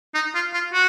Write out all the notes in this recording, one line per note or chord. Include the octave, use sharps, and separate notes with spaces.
D#4
F4
F4
F#4